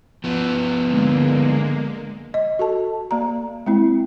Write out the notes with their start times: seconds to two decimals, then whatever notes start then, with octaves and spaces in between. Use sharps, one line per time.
0.24 F3 B3
0.85 D3 G#3 A#3
2.34 D#5
2.59 F#4 A4 A5
3.11 A#3 D5 A#5
3.66 G#3 A#3 C4 E4